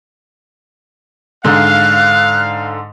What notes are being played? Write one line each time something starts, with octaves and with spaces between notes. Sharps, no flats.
G#2 D3 F5 F#6